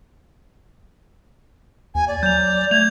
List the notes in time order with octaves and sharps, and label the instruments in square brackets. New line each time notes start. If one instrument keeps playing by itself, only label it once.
[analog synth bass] D#2 [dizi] G#5
[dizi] D5
[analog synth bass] F#3 [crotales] G6 F7
[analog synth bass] A3 [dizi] G#6 [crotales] F7